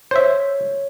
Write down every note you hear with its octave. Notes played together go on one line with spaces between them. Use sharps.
C5 C#5 E5